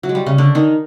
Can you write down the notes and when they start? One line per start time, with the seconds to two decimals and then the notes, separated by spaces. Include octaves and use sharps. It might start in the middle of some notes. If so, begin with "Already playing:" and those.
0.03 F#3
0.09 G#3
0.15 G3
0.26 C#3 C#4
0.38 D3 D4
0.55 D#3 D#4